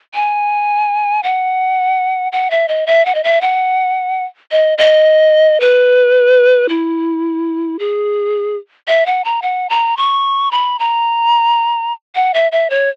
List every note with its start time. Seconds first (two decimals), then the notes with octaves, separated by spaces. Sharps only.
0.14 G#5
1.23 F#5
2.32 F#5
2.51 E5
2.68 D#5
2.87 E5
3.06 F#5
3.15 D#5
3.24 E5
3.41 F#5
4.51 D#5
4.78 D#5
5.60 B4
6.69 E4
7.79 G#4
8.88 E5
9.06 F#5
9.25 A#5
9.42 F#5
9.69 A#5
9.97 C#6
10.51 B5
10.79 A#5
12.15 F#5
12.34 E5
12.52 E5
12.70 C#5